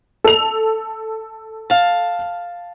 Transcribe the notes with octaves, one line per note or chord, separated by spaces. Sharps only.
A4 F7
F5 A5